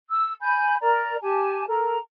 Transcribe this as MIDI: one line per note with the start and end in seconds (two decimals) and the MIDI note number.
0.10 0.33 88
0.41 0.75 80
0.41 0.75 83
0.41 0.75 91
0.81 1.15 70
0.81 1.15 74
0.81 1.15 82
1.22 1.64 67
1.22 1.64 80
1.22 1.64 81
1.68 1.97 69
1.68 1.97 70
1.68 1.97 82